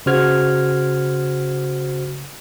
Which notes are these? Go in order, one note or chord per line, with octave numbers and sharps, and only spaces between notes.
C#3 F#4 C5 F6 G#6